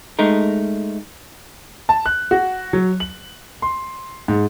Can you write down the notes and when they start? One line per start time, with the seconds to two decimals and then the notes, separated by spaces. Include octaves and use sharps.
0.19 G#3 A3 D#4 A#4
1.89 A5
2.06 F#6
2.31 F#4
2.73 F#3
3.00 F#7
3.62 C6
4.28 G#2